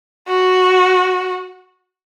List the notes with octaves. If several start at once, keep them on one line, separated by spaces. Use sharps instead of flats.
F#4